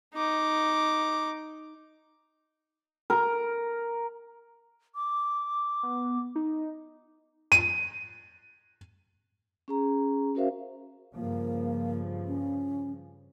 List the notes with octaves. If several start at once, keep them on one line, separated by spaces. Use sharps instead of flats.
D#4 D6
A#4
D6
B3
D#4
D#7
C#4 G#4 A#5
C#4 F#4 A#4 C5 E5 F5
G2 C#3 F3 A#3
C#4